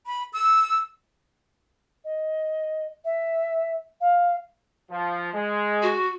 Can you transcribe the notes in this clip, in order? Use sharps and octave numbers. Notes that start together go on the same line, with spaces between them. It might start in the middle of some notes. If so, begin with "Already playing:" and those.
B5
E6
D#5
E5
F5
F3
G#3
F#4